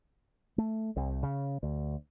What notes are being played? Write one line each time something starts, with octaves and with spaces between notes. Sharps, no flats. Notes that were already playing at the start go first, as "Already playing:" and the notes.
A3
C2
C#3
D2